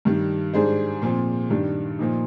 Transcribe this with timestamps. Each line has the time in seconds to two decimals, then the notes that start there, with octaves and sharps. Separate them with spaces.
0.05 G2 D#3 G3
0.53 G#2 G3 D4 G#4 C5
1.02 A#2 F3 C4
1.50 G2 D#3 G3 D4
1.99 A#2 F3 A#3 D#4